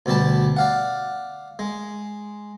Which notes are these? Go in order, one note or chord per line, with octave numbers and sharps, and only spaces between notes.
D2 B2 G3 D5 A5
D5 F5 F#5
G#3